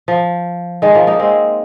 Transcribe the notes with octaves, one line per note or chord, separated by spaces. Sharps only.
F3
D#3 G#3
F3 A#3
A#3 D#4
G#3 C4